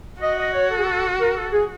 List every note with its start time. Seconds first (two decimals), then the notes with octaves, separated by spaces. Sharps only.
0.21 F#4 D#5
0.38 D#5
0.54 C#5
0.70 A4
0.78 G#4
0.84 A4
1.20 A#4
1.35 A4
1.52 G#4